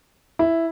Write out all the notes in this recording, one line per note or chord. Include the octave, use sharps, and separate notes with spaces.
E4